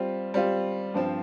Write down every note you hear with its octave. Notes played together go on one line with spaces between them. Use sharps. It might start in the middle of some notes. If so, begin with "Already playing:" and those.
Already playing: G3 C4 F4
G3 C4 F4
G2 F3 C4